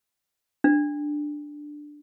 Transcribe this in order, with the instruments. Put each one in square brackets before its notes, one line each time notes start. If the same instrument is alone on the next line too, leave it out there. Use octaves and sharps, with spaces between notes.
[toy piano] D4